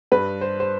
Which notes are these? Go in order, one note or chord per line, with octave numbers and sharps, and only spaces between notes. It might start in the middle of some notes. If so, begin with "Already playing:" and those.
G2 B4
C5
C5